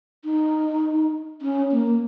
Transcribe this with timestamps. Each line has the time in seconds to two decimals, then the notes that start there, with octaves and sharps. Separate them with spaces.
0.25 D#4
1.42 C#4
1.72 A#3